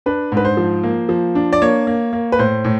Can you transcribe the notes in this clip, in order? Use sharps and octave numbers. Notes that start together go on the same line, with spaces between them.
D4 B4
G#2
B4
C5
F3
A#3
F3
D4
D5
A#3 C#5
A#3
A#3
B4
A2 C5
A2